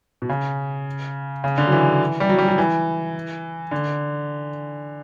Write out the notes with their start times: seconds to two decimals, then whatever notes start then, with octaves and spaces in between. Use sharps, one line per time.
0.22 B2
0.29 C#3
1.44 C#3
1.58 D3
1.67 F#3
1.72 E3
2.20 G3
2.29 F#3
2.38 G3
2.48 F#3
2.58 E3
3.71 D3